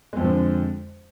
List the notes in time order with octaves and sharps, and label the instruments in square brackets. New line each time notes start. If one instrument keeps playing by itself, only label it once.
[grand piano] G#3
F2
F3
D3